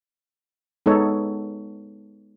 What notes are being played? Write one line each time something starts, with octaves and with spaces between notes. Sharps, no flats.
G#3 B3 D#4 A4 C#5